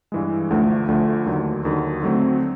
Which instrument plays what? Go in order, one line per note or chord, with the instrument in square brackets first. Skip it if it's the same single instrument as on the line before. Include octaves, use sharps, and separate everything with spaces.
[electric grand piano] G2 E3 G#3
D2 D3 F3 A3
D2 D3 F3 A3
D#2 D3 F#3
D#2 D3 F#3
D3 F#3 A3 C4